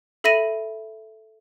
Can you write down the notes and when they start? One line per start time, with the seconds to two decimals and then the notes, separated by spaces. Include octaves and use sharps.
0.24 A4 E5 B5 A#6 D#7